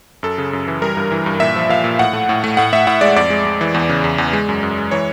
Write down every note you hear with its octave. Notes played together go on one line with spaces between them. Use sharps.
F#2 A4
C#3
F#2
E3
G3 A#4
G2
E3
G2
A#2 E5
F3
A#2 F5
A#2
A2 F#5
A3
A2
A3
A2 F#5
A2 E5
A2 F#5
G#3 D5
F2 D5
G#3
G#3
E3
E2
C#3
E2
E2
G#3
F#2
F#2
G#3
E3 C#5